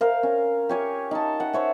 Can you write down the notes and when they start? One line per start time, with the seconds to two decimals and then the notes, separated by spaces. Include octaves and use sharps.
0.01 A#4 C5 F5
0.23 C#4
0.69 G4 C#5 G#5
1.11 D#4 A5
1.40 F#5
1.53 C5 C#5 E5